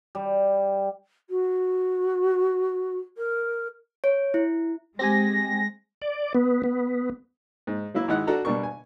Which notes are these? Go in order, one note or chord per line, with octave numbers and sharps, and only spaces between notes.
G3
F#4
A#4
C#5
E4
G#3 C4 G4 G#5 A#6
D5
B3
B3
G#2
F#3 A#3 E4
G#1 G#3 D#4 E4 F#5 F#6
D4 F#4 A4 A#5
B2 G3 D4 A#4 C#6
G#5